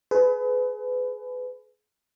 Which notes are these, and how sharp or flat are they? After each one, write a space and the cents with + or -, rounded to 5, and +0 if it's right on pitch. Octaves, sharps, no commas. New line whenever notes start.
G#4 +35 B4 +25